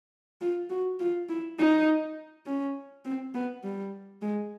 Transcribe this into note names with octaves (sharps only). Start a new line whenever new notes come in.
F4
F#4
F4
E4
D#4
C#4
C4
B3
G3
G#3